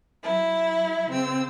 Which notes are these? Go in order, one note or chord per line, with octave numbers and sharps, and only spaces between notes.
F#3 E4
C#3 C4 E6